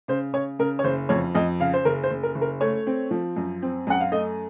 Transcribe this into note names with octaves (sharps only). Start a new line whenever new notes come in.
C#3 C5
C#3 C#5
C#3 A#4
C#5
F#1 C5
F2 C#5
F2 D#5
C#3 F5
C5
F#1 A#4
C5
F#1
A#4
F#1
A#4
A3 C#5
C4
F3
F#2
C4
F#2 F#5
F5
A3 D#5